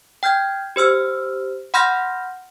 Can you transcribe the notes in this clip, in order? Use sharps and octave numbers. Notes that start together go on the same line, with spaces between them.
G5 F6 G6 G#6
G4 C5 E6 F6
F#5 B5 C6 F6 G6 A#6